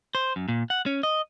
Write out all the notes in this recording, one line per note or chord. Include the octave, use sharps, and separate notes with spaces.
C5
F#2
A#2
F#5
C#4
D#5